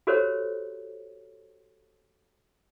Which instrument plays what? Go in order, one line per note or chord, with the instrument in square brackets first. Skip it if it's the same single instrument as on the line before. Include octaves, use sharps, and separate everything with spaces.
[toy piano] F#4 G4 A4 A#4 C5 C#5